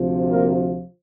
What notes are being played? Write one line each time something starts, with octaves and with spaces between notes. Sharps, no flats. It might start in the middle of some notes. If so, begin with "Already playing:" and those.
Already playing: D2 C3 F3
A#3 A#4